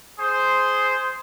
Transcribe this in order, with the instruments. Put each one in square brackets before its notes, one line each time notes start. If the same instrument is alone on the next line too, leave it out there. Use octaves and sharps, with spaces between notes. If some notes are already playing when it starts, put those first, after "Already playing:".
[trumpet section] G#4 C5